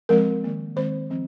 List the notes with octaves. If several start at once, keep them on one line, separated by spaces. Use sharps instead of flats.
F3 G#3 C4 A#4
D#3 A#3
D#3 G#3 C4 C5
F3 C4